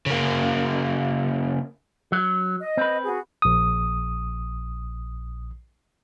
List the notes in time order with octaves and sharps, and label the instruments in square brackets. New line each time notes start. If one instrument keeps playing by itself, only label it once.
[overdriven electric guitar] C#3 A#3
[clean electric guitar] F#3
[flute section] D#5
[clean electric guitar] C4 B4
[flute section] F#4 G#4
[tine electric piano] A#1 D#6